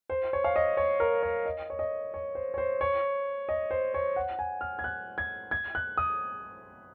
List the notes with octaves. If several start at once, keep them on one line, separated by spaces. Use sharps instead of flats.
C5
C#5
F5
D#5
C#5
A#4
C#5
D#5
C#5
D#5
C#5
C5
C#5
C5
C#5
D#5
C5
C#5
F#5
G#5
F6
G#6
F#6
G#6
G#6
F#6
D#6